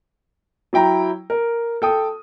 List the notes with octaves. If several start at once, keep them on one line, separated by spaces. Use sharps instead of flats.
F#3 E4 G5 A#5
A#4
A4 G5 D#6